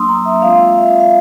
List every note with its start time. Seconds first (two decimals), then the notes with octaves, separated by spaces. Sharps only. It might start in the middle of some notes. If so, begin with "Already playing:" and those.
Already playing: F#3 A#3 D4 C6 D#6 E6
0.09 A#5
0.25 E5
0.41 G#3 C4 F4 F5
0.75 E5
1.00 F5